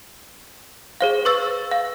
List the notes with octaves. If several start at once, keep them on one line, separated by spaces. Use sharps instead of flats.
G#4 C5 F5
B4 C#6 E6 A6
F5